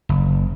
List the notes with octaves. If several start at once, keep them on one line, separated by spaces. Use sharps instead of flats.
F#1